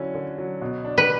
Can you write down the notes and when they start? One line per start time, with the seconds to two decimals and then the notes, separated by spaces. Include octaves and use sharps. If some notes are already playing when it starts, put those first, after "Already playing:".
Already playing: D3 F#3 C#4 E4
0.15 D3
0.38 F#3
0.61 B2
0.85 D4
0.98 B4